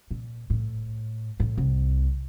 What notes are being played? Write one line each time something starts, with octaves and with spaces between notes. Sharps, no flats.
A#2
A2
A2
C2